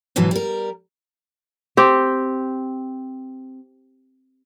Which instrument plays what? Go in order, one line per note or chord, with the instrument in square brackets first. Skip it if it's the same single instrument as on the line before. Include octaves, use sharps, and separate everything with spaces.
[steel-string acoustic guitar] G#2 B2 E3 F#3
G3 A#4
[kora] C4 G4